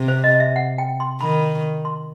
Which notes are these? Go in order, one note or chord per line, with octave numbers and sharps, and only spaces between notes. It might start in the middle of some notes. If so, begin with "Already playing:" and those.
Already playing: C3
C5
D#5
E5
F#5
G5
C6
D#3 B5
C6